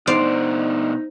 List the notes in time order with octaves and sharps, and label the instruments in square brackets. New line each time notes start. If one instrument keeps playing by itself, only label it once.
[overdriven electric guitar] B2 D4 [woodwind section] D#4 [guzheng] C5 D5 F5